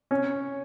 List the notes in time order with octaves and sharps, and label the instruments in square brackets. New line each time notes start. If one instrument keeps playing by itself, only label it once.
[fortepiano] C#4